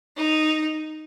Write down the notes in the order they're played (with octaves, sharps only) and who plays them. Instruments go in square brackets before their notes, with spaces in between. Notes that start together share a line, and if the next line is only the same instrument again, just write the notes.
[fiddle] D#4